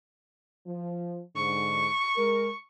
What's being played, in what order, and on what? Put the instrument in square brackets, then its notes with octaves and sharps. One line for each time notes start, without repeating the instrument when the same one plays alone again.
[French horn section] F3
[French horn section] G#2 D3 [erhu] C#6
[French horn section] G#3 A#4